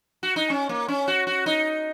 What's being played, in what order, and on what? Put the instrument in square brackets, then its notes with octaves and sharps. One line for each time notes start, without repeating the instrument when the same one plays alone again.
[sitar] F#4
D#4
C#4
A#3
C#4
F#4
F#4
D#4